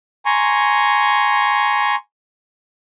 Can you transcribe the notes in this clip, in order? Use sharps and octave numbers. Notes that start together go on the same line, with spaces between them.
G#5 A#5 C6 C#6